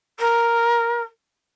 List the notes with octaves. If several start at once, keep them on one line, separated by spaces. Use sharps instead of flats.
A#4